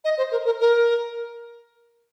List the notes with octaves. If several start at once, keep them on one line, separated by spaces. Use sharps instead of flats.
D#5
C5
A#4
A#4
A#4